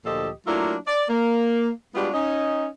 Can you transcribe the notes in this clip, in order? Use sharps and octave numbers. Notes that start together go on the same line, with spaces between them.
D2 A#2 F3 G4 A4 D#5
F#3 A3 A#3 D4 E4 F4
D5
A#3
G3 G#3 B3 D4 F4 F#4
C#4 D#4 D#5